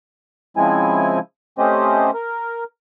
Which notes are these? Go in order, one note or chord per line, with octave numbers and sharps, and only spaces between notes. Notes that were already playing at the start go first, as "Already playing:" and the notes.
C#3 F3 G#3 C4 E4 G#5
A3 C4 C#4 G4 C5 D#5
A#4